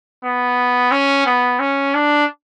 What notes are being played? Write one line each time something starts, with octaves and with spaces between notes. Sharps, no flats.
B3
C#4
B3
C#4
D4